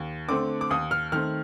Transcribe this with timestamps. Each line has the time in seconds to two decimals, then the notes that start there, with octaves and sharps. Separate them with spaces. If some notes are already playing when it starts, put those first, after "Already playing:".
Already playing: D#2
0.29 D3 A3 C4 D6
0.61 D6
0.71 D#2 D#6
0.91 F6
1.12 D#3 A3 C4 F6